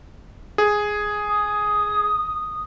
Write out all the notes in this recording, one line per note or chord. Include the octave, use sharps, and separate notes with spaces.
G#4
D#6